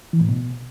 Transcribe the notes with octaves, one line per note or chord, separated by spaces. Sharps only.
E3
A2
B2